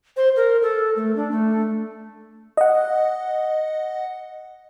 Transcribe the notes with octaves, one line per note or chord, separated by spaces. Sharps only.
C5
A#4
A4
A3
D4
A3
D#5 F#5